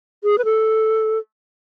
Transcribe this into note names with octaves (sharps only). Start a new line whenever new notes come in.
G#4
B4
A4